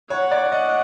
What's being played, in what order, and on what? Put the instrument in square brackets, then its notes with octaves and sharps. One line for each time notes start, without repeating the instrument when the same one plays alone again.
[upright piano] C#5 [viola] F#5
[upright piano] D5
D#5